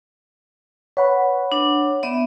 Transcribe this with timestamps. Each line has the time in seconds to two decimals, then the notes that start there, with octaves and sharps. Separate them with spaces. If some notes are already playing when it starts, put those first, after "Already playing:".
0.97 B4 C#5 F#5 B5
1.52 D4
2.03 B3 D5 E5